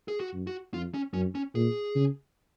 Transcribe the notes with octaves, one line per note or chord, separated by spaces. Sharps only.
G#4
F#4
F#2
F#4
F2 F4
C#4
F#2 C#4
C#4
A#2 G#4
C#3